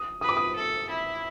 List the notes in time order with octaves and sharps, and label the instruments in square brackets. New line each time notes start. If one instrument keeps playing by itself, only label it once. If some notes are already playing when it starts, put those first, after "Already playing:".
Already playing: [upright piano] D#6
[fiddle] B4 [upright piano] D#6
[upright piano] D6
D#6
[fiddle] A4
E4